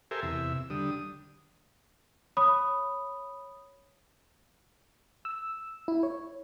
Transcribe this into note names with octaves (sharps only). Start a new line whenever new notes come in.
G4 A4 A#4 C5 E5 G#5
E2 C3 E5
D3 G3 D#6
C#5 B5 D#6
E6
E4
C#5